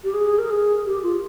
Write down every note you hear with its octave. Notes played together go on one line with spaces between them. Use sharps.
G4
G#4
A#4
G#4
G4
F4